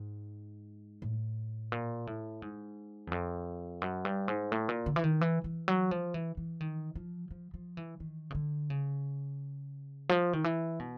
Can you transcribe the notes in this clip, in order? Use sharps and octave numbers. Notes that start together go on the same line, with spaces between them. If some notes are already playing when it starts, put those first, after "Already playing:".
Already playing: G#2
A2
A#2
A2
G#2
E2
F2
F#2
G2
G#2
A2
A#2
D3
E3
D#3
E3
E3
F#3
F3
E3
E3
D#3
F3
F3
F3
E3
D#3
C#3
D3
C#3
F3
D#3
E3
B2